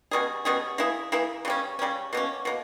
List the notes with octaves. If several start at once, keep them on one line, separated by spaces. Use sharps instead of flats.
B2 G3 C#4 G#4
B2 G3 C#4 G#4
E3 A#3 E4 G#4
E3 A#3 E4 G#4
C#3 G3 C#4
C#3 G3 C#4
B2 A#3 C#4
B2 A#3